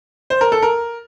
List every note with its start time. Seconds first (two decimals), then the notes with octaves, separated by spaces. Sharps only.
0.30 C5
0.41 A#4
0.52 A4
0.63 A#4